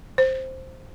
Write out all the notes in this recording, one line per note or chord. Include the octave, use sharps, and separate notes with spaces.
C5